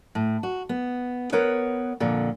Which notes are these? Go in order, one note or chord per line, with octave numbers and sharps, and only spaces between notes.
A2
F#4
B3
B3 A#4 B4 C#5
F2 A#2 D3